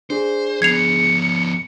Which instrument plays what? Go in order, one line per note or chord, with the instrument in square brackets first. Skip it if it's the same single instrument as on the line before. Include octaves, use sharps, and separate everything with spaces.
[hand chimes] D4 G#4 [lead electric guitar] C5
[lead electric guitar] F3 B3 [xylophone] G#6 C7 F7 [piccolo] C#7